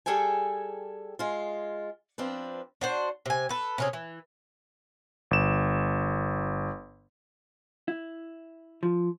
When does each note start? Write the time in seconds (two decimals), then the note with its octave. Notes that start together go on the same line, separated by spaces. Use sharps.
0.06 G3 G#4 A4 G5 G#5
1.19 G#3 F4
2.18 F3 C4 D4 B4
2.81 D4 F#4 C5
3.26 C3 G#5
3.49 A4 B4
3.78 C3 C#4 G#4
3.93 E3
5.31 G1 E7
7.88 E4
8.83 F3